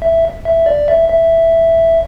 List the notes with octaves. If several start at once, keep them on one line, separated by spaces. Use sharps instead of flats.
E5
E5
D5
E5
E5